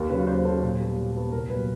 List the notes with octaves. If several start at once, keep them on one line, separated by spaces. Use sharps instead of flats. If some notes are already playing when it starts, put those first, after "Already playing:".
Already playing: D#2 A#4
C#3 F#3 B4
D#2 C5
C#3 F#3 A4
A#2
G3 B3
A#2
G3 B3
C2 A#4
A#2 F#3 B3 B4